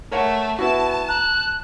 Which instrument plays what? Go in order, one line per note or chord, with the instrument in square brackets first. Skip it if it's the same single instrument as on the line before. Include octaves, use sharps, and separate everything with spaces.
[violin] A3 [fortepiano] A#4 C#5 F#5
[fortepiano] B3 E4 F#4 [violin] A5
[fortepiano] A#5 [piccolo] F#6